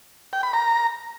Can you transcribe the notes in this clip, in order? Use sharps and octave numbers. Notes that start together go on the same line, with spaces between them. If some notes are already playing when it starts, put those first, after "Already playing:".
G5
B5
A#5